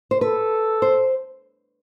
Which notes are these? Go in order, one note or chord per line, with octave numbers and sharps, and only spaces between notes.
C5
A4 B4
C5